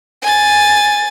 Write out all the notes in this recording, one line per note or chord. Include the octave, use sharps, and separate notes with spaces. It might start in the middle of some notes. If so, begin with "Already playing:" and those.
G#5 A6